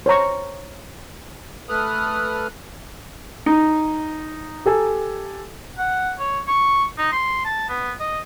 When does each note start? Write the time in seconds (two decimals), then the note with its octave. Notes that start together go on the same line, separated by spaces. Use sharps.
0.06 C5 C#5 A#5 C#6
1.69 A3 A4 B4 D#6 F6 F#6
3.46 D#4
4.66 G4 A4 G#5
5.78 F#5
6.19 C#5
6.48 C#6
6.98 D#4
7.12 C6
7.45 A5
7.69 B3
8.00 D#5